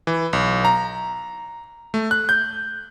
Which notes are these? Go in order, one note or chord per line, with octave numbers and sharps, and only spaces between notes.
E3
B1
A#5
A3
F#6
G6